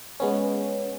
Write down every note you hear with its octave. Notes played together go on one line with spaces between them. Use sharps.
G#3 B3 C#4